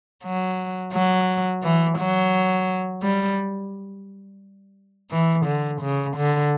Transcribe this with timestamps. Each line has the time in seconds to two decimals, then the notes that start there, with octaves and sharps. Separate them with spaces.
0.24 F#3
0.93 F#3
1.63 E3
1.98 F#3
3.03 G3
5.11 E3
5.46 D3
5.82 C#3
6.17 D3